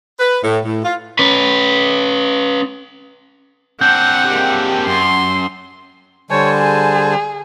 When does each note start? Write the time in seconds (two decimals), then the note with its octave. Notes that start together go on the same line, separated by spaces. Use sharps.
0.19 B4
0.43 A2
0.65 A2
0.84 F4
1.19 C#4 B4
3.81 C4 D4 F#5 G6
4.26 G#3 A#3 G4
4.86 F#2 C6
6.30 D3 G3 C5 C#5 G#5 A5
6.61 G#4